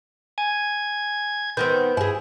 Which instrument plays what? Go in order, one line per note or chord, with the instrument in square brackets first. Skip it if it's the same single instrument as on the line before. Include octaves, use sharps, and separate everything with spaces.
[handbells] G#5 [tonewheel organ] G#6
[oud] D#3 B3 C4 [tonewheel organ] B4 [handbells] G6
[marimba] G2 [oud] E4 G#4